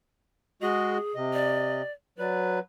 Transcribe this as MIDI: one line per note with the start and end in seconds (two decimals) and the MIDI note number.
0.62 0.98 56
0.62 0.98 66
0.62 1.13 68
0.62 0.98 75
1.15 1.82 48
1.15 1.82 75
1.33 1.92 74
2.18 2.59 54
2.18 2.59 71
2.18 2.58 74